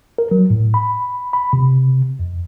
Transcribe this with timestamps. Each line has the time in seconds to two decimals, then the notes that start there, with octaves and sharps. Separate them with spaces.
0.18 A#4
0.31 F#3
0.50 A2
0.74 B5
1.33 B5
1.53 C3
2.19 F2